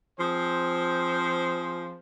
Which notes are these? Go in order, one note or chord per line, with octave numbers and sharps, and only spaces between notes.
F3 C4 G#4 C5